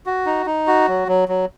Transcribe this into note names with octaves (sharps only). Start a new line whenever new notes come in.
F#4
D#4
D#4
F#4
F#3
F#3
F#3